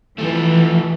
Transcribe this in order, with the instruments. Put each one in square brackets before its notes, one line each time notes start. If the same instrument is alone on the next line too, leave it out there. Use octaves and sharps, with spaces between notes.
[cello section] E3 [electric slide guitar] F3 A3